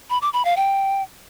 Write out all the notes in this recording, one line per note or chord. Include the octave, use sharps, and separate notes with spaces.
B5
D6
B5
F5
G5